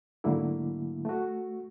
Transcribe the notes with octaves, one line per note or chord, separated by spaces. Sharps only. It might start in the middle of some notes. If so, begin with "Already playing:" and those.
G#2 D3 F#3 A3 A#3 E4
A3 F#4